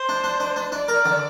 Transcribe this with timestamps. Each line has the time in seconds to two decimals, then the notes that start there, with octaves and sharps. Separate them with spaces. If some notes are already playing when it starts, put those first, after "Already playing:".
Already playing: C5
0.09 D4
0.24 D4
0.40 D4
0.56 D4
0.72 D4 D5
0.88 A#4
1.05 D3